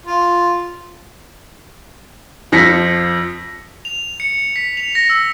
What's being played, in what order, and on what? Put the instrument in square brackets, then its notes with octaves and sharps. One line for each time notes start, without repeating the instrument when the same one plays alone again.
[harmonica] F4
[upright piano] F2 F3 A#6 B6 C#7
[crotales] F7
C#7
B6
F7
A#6
E6